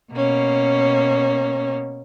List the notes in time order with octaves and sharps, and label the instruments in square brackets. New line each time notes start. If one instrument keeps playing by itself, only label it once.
[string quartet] B2 A#3 C#4